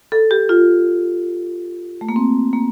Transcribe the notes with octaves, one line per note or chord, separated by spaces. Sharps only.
A4
G4
F4
A3
A#3
C4
A#3